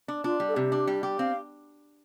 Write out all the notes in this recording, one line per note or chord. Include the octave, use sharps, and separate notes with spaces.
D4
D4 F4
G3
A4
C3 G4
D4
G3
G4
C4 F5